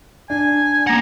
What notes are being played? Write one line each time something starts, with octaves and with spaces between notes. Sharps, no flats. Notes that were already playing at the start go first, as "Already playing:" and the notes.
D4 G#5
A#3 F#5 A#5